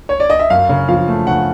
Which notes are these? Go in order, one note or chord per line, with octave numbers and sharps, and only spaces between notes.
C#5
D5
D#5
E5
F#2 F5
C#3
F3 F5
A3
C#3 F#5